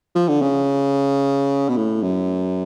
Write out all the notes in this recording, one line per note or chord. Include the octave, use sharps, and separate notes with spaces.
F3
D3
C#3
B2
A2
F#2